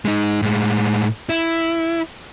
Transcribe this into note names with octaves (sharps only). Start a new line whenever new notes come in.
G#3 D#4
A2 G#3
E4